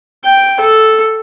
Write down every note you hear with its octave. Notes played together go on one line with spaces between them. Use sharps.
G5
A4